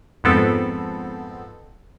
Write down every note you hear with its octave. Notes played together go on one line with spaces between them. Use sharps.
F2 G#2 B3 C4 A4